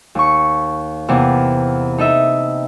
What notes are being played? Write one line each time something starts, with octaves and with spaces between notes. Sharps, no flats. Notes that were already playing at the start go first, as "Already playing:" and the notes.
D#2 C#6
E2 C3 A#3 B3
D#4 A4 D#5 E5